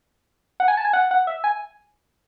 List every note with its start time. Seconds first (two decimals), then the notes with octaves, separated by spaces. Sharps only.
0.60 F#5
0.68 G#5
0.77 A5
0.85 G#5
0.93 F#5
1.11 F#5
1.27 E5
1.44 G#5